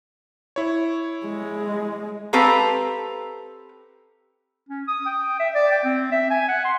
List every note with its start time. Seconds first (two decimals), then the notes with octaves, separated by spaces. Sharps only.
0.56 E4 C#5
1.26 G#3
2.33 C4 G4 A4 B4 F5 A#5
4.69 C#4
4.88 D#6
5.06 G5
5.40 E5
5.55 D5
5.72 G5
5.84 C4
6.12 E5
6.31 G#5
6.49 F#5
6.65 C6